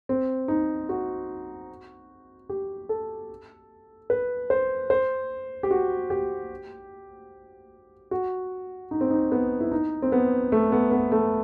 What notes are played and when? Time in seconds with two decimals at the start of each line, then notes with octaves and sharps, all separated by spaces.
0.09 C4
0.48 D#4
0.89 F#4
2.49 G4
2.89 A4
4.10 B4
4.50 C5
4.90 C5
5.63 G4
5.71 F#4
6.10 G4
8.11 F#4
8.91 D#4
9.01 C4
9.10 D#4
9.32 B3
9.60 E4
9.71 D#4
10.02 C4
10.12 B3
10.52 A3
10.72 B3
10.91 B3
11.12 A3